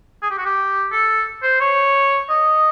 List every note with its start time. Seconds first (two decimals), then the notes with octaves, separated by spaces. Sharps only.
0.22 G#4
0.31 G4
0.38 F#4
0.46 G4
0.92 A4
1.43 C5
1.61 C#5
2.29 D#5